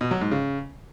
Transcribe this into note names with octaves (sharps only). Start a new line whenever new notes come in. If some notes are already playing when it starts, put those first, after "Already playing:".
B2
F#3
G#2
C#3